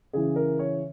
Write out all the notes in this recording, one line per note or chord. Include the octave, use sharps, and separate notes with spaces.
C#3 E3 G#4
A#4
C#5